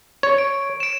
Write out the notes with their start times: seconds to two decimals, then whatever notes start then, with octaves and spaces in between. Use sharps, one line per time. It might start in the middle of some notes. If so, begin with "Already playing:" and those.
0.23 C#5
0.38 D7
0.80 D7 E7